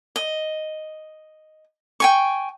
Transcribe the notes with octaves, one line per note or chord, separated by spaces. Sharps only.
D#5
G5 G#5 C#6